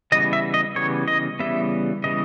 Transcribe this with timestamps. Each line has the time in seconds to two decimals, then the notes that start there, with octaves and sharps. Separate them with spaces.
0.12 C#3 E3 G3 B3 D#5
0.33 E5
0.54 D#5
0.76 C#3 E3 G3 B3 C#5
1.08 D#5
1.39 C#3 E3 G3 B3 E5
2.04 C#3 E3 G3 B3 D#5